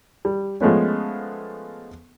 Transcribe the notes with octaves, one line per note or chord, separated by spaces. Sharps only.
G3
F3 G#3 A3 B3 C#4